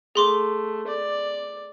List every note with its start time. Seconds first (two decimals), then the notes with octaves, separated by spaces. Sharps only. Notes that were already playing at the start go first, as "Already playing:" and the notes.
0.15 A3 G#4 C6 D6
0.87 D5